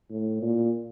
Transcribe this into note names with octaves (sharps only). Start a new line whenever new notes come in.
A2
A#2